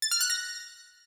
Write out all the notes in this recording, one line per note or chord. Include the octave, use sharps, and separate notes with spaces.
A6
F6
F#6
A#6